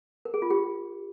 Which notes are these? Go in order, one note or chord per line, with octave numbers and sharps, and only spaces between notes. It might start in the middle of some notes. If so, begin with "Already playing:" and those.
A#4
G#4
F4
G4